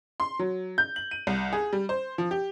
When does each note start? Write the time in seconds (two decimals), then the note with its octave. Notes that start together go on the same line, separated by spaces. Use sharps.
0.20 C6
0.39 F#3
0.78 G6
0.96 F#7
1.11 D#7
1.27 C2
1.53 G#4
1.73 G3
1.89 C5
2.18 F3
2.31 G4